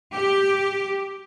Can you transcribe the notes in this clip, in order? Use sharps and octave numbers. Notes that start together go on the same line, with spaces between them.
G4